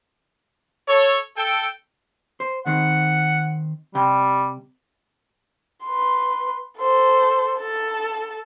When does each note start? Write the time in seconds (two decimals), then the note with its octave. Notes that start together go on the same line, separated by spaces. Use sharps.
0.89 A4 C#5
1.37 A4 G5
2.40 C5
2.66 D#3 C4 F#5
3.95 C3 G3 G5
5.85 B4 C6
6.79 A4 C5
7.60 A4 A5